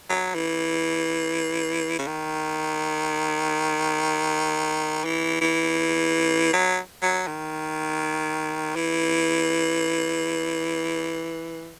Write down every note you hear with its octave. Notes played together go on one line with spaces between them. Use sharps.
F#3
E3
C#3
D#3
E3
E3
F#3
F#3
D#3
E3